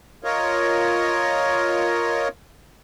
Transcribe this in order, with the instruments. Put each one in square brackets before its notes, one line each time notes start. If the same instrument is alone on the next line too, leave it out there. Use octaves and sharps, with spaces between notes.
[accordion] F4 A#4 C#5 D#5